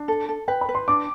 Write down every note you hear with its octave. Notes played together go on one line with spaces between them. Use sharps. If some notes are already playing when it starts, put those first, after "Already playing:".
Already playing: D4
A4
A4
B4 G5
B5
B4
C6
D4 D6